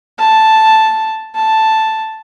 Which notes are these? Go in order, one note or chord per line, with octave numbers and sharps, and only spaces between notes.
A5
A5